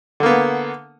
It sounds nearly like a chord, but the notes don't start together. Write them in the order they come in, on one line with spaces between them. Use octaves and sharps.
D3 A#3 B3